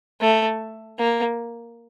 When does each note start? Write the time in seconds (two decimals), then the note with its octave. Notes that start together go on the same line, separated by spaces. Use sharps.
0.21 A3
0.98 A#3